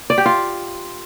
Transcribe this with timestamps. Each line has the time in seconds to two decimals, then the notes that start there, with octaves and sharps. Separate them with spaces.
0.10 D5
0.18 G4
0.26 F4